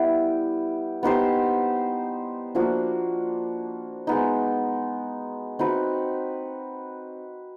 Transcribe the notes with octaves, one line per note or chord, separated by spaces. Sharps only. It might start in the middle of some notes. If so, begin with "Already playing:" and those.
Already playing: G3 B3 E4 G4
B3 D#4 G4 C5
F3 A#3 D4 F#4
G#3 B3 D#4
C4 D#4 F#4 B4